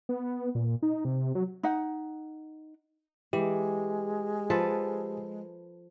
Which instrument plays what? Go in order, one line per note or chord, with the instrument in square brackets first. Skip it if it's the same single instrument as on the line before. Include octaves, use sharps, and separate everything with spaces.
[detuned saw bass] B3
A#2
D#4
C3
F#3
[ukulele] D#4 F#5
[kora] E3 [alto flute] G#3 [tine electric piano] G4
[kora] F3 A4 B4